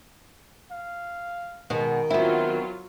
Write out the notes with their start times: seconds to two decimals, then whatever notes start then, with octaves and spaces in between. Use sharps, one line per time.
0.71 F5
1.70 B2 D#3 G#3
2.10 F#3 B3 C4 E4 F4